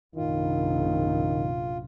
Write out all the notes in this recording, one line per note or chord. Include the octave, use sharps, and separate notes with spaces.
A#1 F#2 C3 D#3 F4